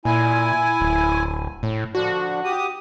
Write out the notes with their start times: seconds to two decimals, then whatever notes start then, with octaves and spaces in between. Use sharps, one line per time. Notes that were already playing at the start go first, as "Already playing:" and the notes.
0.05 A#2 E4 G#5
0.81 D1
1.63 A2
1.95 D3 F3 D4 F#4
2.44 G4 D#6